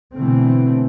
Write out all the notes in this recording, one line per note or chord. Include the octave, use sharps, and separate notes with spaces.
B2 D3 E3 A3 C4